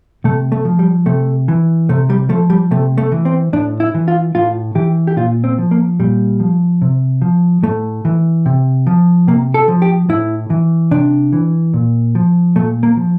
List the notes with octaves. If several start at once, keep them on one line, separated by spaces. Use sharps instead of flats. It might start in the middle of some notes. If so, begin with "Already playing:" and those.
C3 A3
A3
F3
G3
C3 A3
E3
C3 A3
G3
F3 A3
G3
C3 A3
A3
E3
C4
A2 D4
E4
E3
F4
A2 F4
E3 G4
G4
A#2 F4
C4
F3
A#3
A#2 G3
F3
C3
F3
A2 A3
E3
C3
F3
C3 A#3
A4
F3
G4
A2 E4
E3
C3 D4
E3
A#2
F3
A#2 A3
A#3
F3